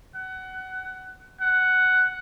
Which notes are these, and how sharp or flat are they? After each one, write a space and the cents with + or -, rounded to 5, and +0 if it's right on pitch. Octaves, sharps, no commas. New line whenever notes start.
F#5 +20
F#5 +5